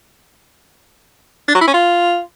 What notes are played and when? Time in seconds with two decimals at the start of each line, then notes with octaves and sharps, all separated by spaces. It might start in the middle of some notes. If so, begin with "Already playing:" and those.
1.48 D4
1.54 F#3
1.61 E4
1.67 C#4
1.74 F4